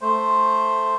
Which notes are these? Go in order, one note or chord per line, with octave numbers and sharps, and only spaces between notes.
A3 C5